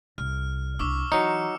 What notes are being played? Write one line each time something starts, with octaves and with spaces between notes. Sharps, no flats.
C2 F6
C2 D4 C#6 D6 E6
E3 F#3 D#4 C#7